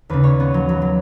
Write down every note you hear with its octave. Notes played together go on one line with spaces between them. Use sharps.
D#2 C#3 B4
C#5
B3
F#3
F#3
F#3